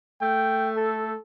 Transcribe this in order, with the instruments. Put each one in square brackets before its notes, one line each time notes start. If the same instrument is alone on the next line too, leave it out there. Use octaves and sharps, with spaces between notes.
[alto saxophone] A3 [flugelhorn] G5
[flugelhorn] A4